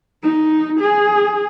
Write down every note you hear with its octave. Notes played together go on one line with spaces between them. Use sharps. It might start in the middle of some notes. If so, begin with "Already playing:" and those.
D#4
G#4